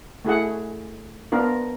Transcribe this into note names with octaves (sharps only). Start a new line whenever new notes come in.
A3 E4 G#4 F#5
B3 D4 F4 A#4